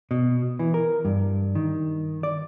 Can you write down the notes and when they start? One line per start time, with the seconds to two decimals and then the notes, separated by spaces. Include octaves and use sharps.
0.11 B2
0.59 E3
0.74 A#4
1.05 G2
1.55 D#3
2.23 D5